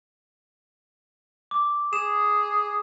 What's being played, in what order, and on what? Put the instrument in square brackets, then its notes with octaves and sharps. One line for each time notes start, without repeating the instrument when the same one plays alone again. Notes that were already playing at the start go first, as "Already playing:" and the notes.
[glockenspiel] D6
[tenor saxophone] G#4 [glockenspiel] E7